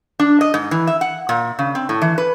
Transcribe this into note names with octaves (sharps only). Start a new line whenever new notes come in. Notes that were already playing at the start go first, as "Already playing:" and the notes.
D4
D#5
G#2
E3
E5
F#5
A#2
C#3
C4
A2
E3
B4